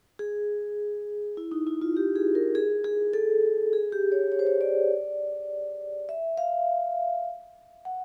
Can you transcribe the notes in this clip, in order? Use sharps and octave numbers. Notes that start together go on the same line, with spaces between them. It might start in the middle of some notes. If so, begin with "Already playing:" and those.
G#4
E4
D#4
E4
F4
G4
G#4
A#4
G#4
G#4
A4
G#4
G4
C#5
C#5
C5
C#5
D5
E5
F5
F#5